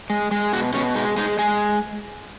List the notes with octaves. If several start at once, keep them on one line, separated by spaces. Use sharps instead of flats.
G#3
G#3
B2 F#4
B2 C#4
G#3 D#4
G#3 D#4
G#3 G#4